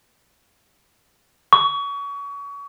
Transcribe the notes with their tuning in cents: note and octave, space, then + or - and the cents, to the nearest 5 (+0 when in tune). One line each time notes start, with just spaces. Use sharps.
C#6 +30